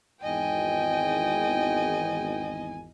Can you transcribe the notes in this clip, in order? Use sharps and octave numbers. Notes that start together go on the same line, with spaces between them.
G#1 E2 D#5 G5 G#5